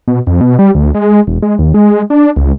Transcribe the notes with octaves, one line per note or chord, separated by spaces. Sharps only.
B2
F2
B2
G3
D2
G#3
E1
G#3
D#2
G#3
D4
C#2